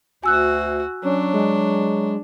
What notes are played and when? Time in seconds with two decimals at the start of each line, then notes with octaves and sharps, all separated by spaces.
0.24 D2 F#4 G#5 E6 F#6
1.04 F#3 C#4 D4
1.34 G#3